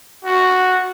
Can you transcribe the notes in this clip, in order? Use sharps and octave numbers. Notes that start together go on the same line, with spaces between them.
F#4